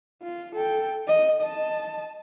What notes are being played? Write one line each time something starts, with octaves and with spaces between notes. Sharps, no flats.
F4
A4 G5
D#5
D#5 A5